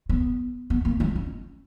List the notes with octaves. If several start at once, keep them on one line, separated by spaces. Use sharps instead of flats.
B3
B3
A#3
G#3
C#4